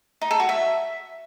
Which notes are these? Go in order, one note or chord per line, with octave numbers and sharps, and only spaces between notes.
D#4
A4
F#4
E5